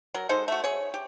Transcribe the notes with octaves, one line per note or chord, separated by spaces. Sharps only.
F#3 A#4
G#3 D#4 A4 C5
A3 F#4
G#4 C#5
G4